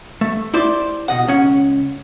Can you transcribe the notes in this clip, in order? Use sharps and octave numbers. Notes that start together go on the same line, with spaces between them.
A3
E4 G4 C5 D5
B2 D#5 F#5
C#2 C#4 F#5